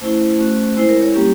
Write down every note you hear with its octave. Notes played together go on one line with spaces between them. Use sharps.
A3 C#4 E4 C5
A3 C#4 F#4
G#3 C4 E4 C5
A#4
C#5
G3 A#3 C#4 G4